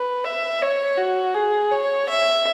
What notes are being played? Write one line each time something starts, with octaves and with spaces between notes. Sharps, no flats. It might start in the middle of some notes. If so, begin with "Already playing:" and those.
Already playing: B4
E5
C#5
F#4
G#4
C#5
E5